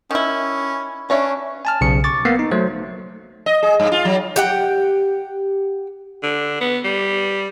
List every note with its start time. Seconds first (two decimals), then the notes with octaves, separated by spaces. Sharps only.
0.11 D#3 C#4 E4
1.10 C#4 D4 C#5 E5
1.65 G#5 A5 F6
1.81 B1 C#3 C#7
2.04 C#6 D6 A6
2.25 A#3 B3 C7
2.39 D#4
2.51 F#3 A3 C5
3.46 D#5
3.63 G#4
3.80 G2
3.92 F4
4.05 F#3
4.36 G4 F#5 G5
6.23 D3
6.61 B3
6.84 G3